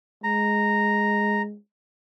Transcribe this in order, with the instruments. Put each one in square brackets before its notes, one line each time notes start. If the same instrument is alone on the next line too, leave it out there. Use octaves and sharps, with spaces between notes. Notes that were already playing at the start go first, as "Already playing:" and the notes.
[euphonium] G#3 [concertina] A#5